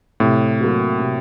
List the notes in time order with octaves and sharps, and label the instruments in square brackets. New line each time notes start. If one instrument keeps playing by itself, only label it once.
[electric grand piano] A2 [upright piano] C3
[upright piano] F#3 A#3 F#4
C3